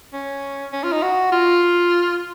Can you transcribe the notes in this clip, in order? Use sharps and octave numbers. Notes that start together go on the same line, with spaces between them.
C#4
C#4
F4
D#4
F#4
F4